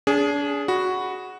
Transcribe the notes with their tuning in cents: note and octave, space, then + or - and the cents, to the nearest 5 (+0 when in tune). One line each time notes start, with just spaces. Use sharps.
D4 -35 G#4 +0
F#4 +0 B5 +0